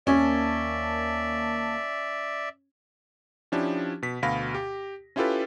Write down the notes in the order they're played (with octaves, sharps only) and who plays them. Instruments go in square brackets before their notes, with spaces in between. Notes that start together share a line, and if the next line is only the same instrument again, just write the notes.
[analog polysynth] D#2 A#3 A5 [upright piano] C#4 [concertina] D5 E5
[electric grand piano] F3 C#4 D4 E4 G4
B2 B6
D2 B2 F5 B5 A#6
G4
C#4 E4 F4 G4 A4 B4